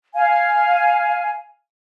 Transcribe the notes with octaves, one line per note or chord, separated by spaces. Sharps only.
F5 G#5